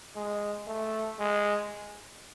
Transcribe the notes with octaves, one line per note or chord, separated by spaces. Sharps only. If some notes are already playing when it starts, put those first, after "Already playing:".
G#3
A3
G#3